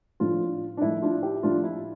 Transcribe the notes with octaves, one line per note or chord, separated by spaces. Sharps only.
A2 F3 A3 D4 F4
D4
A2 F3 A3 E4
D4 F4
E4 G4
A2 F3 A3 D4 F4
E4